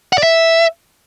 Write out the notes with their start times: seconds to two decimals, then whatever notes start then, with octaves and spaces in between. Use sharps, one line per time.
0.13 F#5
0.18 D5
0.23 E5